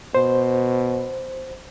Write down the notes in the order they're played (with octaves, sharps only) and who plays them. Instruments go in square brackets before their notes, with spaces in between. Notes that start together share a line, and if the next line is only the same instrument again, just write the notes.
[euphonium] B2 [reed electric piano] C5